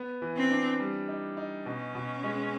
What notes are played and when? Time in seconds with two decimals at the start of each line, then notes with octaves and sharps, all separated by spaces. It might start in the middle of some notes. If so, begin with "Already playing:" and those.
Already playing: B3
0.22 E3
0.37 C4
0.51 D4
0.80 G3
1.08 D#4
1.37 D#4
1.66 B2 C#4
1.95 B2
2.24 G#3